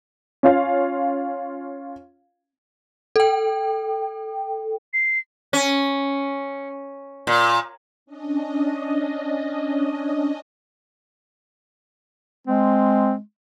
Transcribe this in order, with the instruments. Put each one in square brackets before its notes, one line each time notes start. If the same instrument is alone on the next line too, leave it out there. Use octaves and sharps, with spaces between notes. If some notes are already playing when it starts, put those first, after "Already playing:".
[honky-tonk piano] C#4 F4 F5
[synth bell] A4 G5
[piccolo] C7
[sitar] C#4
A#2
[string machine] C#4 D4 D#5
[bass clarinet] G#3 [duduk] C4